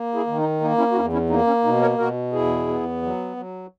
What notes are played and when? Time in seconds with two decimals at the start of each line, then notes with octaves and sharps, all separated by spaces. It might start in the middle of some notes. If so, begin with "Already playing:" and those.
Already playing: A#3
0.14 E4 G#4
0.27 D#3
0.38 D#4
0.61 A#3 D#4
0.78 C#4 E4
0.92 F#4
0.95 E2 C#4 E4
1.12 C#4 E4
1.30 A#3 D#4
1.47 C#4
1.64 B2 D#4
1.81 A#4 C#5
1.98 B2 F#4 A#4
2.33 E2 E4 G#4
2.68 B3
3.02 F#3
3.37 F#3